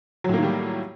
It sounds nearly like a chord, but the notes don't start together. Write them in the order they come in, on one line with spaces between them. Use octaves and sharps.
F#3 A2 A#3 D#3 G3